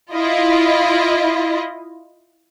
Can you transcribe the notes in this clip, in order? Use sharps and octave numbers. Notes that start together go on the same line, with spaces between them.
E4 F4 D#5